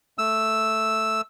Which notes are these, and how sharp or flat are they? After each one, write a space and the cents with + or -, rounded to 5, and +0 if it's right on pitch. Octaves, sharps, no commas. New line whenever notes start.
A3 +0 E6 +0